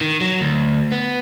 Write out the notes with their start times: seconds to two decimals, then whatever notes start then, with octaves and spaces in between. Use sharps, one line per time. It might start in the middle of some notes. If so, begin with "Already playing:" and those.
0.01 D#3
0.21 F#3
0.41 D2
0.92 B3